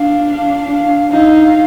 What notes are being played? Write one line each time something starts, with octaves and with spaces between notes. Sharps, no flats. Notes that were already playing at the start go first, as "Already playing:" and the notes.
Already playing: D4 F5
F5
D#4 F5